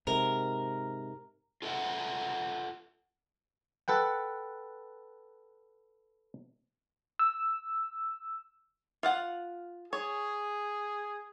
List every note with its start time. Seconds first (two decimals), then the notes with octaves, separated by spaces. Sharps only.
0.07 G#2 C3 A#4
1.62 F4 A4 B4 E5 F#5
3.88 A4 B4 F#5 G5
7.19 E6
9.03 F4 F5 F#5
9.93 G#4 C#5